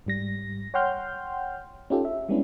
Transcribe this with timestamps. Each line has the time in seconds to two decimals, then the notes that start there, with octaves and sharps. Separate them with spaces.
0.06 G#2 G3 A#6
0.74 C#5 F#5 G5 C6 F6 G6
1.90 C#4 D#4 F4 G4 A4
2.05 E5
2.29 G3 G#3 B3 C#4 D4 E4